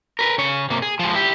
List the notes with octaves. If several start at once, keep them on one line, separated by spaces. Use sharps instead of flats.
A#4 B4
C#3 C#5
C3 A#3
G#4
F3 G#3
E4 G4